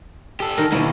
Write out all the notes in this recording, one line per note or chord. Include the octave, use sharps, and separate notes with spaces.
G4 A4
D#3 A#4
D#2 G#2 B2 E4